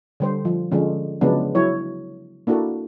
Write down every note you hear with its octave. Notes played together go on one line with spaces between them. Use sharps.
D3 G3 C5
F3
D3 F3 G#3 C#4
C#3 F3 F#3 G#3 B3 D4
F#3 E4 C#5
A#3 D4 E4 F#4 A4